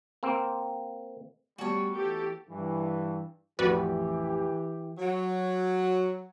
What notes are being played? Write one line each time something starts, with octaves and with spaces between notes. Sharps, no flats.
A#3 C4
G3 A3 B3 F#4 C#5
E3 G4 A4
G2 E3
A1 F2 E3 F#4 G4 B4 D5
F#3